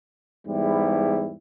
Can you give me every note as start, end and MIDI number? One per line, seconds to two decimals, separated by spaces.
0.46 1.32 40
0.46 1.32 44
0.46 1.32 55
0.46 1.32 64